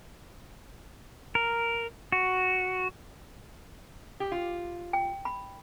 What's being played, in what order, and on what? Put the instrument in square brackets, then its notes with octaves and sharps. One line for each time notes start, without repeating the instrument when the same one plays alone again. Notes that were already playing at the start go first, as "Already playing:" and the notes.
[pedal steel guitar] A#4
F#4
[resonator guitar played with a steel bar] G4
F4
[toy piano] G5
B5